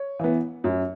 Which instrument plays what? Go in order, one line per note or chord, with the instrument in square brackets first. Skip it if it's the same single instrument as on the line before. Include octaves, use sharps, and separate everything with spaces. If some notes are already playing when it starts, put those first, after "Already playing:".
Already playing: [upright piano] C#5
E3 B3
F#2